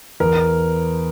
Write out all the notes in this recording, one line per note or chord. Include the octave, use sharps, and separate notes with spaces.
E2 A#4